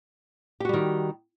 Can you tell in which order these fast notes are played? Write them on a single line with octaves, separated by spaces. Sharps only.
G4 F#4 G3 D#3